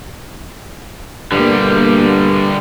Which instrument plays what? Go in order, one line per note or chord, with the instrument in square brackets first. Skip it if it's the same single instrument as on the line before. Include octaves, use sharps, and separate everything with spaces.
[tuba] G2 [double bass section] B2 A#3 [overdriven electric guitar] D3 G3